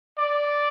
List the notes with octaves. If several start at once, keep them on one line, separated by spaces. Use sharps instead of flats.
D5